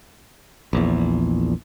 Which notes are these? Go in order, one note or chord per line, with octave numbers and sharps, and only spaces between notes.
A#1 E2